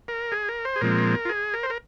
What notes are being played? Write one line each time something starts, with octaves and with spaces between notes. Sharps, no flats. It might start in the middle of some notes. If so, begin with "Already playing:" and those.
A#4
G#4
A#4
C5
G#4
A#2 F3 G#3 C4 A#4
F4
G#4
A#4
C5
A#4